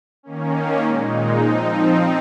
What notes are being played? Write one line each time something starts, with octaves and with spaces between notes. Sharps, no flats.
D#3 A#3 C#4
A#2 G#3 D#4
F3 C4 D#4